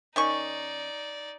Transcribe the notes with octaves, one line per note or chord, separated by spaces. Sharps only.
D#3 C#4 D#4 D5 C#6